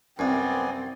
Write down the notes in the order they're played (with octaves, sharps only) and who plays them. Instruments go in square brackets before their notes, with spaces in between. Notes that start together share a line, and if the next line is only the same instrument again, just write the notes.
[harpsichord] C2 F#2 [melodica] B3 D5 G#5 [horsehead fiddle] C4